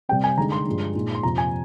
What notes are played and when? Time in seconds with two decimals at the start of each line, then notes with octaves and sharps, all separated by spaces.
0.09 C3 G3 C4 G5
0.24 G#5
0.37 D3 G#3 D#4 A#5
0.52 C6
0.66 G2 F3 G#3 D4
0.95 A#2 G#3 D#4
1.15 C6
1.23 F2 C3 F3 A#5
1.38 G#5